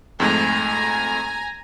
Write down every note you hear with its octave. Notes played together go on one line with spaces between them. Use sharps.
F2 G#2 A3 G#5 A#5